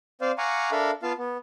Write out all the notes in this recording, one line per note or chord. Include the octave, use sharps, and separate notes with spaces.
C4 C5 D5 F5
F5 F#5 G#5 A#5 C#6 D6
D4 A4 A#4 E5 F5 B5
B3 F4 F5 A5
B3